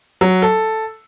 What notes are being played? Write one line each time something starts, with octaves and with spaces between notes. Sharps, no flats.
F#3
A4